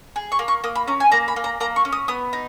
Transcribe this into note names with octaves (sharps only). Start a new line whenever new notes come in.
G#4
C#6
A#3
C#6
A#3 D#6
B5
C#4 A#5
G#5
A#3 A#5
B5
A#3
A#5
A#3 A#5
C#6
C#4
D#6
B3 D#6
D#4